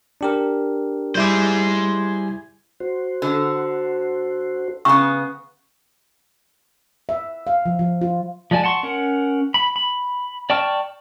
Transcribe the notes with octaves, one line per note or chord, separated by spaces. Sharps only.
D4 G4 A#4
G3 E4 G#4 C5 D6
F#4 C5
D3
C#3 B3 C#6
E5
F5
F3
F3
F4
F3 G#3 D5 G#5 A5
F#5 A5 C6 C#6
C#4 A#4 F#5
B5
B5
D5 G5 A5 C#6 F6